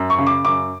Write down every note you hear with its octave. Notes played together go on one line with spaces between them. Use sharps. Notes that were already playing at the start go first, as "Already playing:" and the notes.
Already playing: F#2
C#6
C#3
D6
F#2 D6